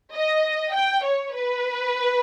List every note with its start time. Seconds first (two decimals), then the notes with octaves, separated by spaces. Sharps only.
0.14 D#5
0.74 G5
1.04 C#5
1.34 B4